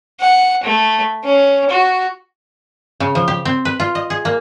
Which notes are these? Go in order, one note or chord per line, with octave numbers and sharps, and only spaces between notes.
F#5
A3
C#4
F#4
C#3
F3
G4
C4
B4
F4
D#5
G#4
A#3